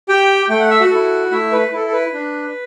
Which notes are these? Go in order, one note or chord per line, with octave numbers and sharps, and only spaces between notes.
G4 G5
A3 G5
F#5
E5
F#4 F#5
E4 A4
A3 E4 E5
B4
E4 A4
A4
B4
D4